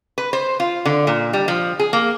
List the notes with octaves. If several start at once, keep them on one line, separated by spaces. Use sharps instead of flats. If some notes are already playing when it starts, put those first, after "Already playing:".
B4
C5
F4
D3
A#2
G3
F3
G#4
A#3